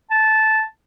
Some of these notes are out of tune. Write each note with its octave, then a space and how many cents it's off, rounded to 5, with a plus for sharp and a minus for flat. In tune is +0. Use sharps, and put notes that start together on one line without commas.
A5 -10